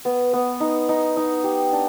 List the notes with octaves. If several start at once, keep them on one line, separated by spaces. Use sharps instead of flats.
B3
B3
D#4
D#4
D#4
G4
D4